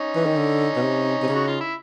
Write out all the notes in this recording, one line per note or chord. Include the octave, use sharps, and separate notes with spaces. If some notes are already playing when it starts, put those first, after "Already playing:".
Already playing: C#4 D#4
E3
D#3
D3
B2
C3
C3
C#3
F#4
F4
E4